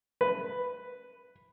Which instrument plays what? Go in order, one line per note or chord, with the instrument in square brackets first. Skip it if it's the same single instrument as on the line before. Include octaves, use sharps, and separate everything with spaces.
[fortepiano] B4